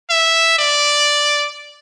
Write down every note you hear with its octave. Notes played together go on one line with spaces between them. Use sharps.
E5
D5